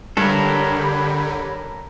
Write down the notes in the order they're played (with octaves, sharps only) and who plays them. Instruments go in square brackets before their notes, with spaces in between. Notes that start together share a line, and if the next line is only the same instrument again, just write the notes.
[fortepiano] G2 [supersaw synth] D3 [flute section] G4 C#5 B5 [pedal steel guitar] A4 A#4